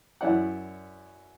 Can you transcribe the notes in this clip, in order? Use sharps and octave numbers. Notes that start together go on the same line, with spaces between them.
F#2 E4 C#5 D5 F#5